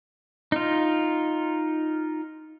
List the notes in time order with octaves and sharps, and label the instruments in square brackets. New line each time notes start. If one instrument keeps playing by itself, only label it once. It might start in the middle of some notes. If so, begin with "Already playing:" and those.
[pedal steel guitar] D#4 F4